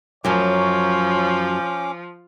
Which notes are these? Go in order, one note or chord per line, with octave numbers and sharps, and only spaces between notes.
F#2 F3 F#3 C#4 C#5 D6